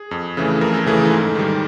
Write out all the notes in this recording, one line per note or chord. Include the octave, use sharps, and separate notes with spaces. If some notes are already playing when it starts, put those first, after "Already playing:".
Already playing: G#4
F2
C#3 E3 A3
F2 A#4
A4
C#3 E3 A3 G#4
A4
G#2
D#3 G3